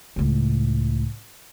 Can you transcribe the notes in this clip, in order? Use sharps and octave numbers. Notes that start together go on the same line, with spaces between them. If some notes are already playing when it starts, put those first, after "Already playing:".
C#2 A2